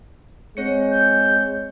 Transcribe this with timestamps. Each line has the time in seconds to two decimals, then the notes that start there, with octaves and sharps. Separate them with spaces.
0.57 G#3 C4 C#5 C#7
0.92 G6